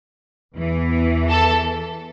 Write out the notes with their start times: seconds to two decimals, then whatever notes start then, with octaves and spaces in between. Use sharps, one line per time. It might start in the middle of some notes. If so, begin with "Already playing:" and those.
0.55 E2 E3
1.30 A4